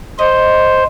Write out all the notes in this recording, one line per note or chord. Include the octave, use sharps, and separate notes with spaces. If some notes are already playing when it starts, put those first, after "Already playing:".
C5 D#5